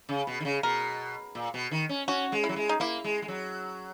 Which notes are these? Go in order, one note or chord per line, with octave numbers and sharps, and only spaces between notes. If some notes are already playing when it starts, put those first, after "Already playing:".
C#3
B2
D#3
C#3
B2 A#4
A#2
B2
D#3
C#4
C#4 F#4
G#3
E4
F#3
G#3
D#4
A#3 E4
G#3
G#3
F#3